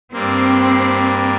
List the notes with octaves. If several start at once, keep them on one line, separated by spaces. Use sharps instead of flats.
G2 G3 A#3 C4